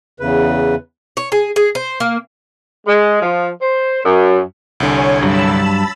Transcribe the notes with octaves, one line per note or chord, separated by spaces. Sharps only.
E2 C#3 B4
C#5
G#4
G#4
C5
A#3
G#3
F3
C5
F#2
C2 D3 C#5 G#5
G2 F#3 A5 B5 E6